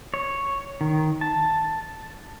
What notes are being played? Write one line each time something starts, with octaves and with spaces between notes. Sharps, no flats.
C#5
D#3
A5